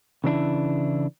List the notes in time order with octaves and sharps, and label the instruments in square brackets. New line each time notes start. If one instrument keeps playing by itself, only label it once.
[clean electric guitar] C#3 E3 D4 E4